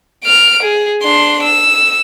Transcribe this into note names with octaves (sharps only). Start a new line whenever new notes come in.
F6 D7
G#4
D4 C6
E6